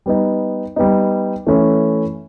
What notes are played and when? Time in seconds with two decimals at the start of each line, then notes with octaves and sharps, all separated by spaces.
0.06 G3 B3 D#4
0.76 G3 B3 D#4
1.47 E3 A3 C#4 E4